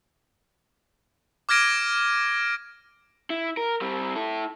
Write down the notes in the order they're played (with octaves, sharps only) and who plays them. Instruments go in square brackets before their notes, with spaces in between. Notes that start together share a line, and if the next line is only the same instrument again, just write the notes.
[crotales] D6 F6 G#6 A#6 D7 D#7
[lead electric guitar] E4
A#4
G3 C4
E4 A4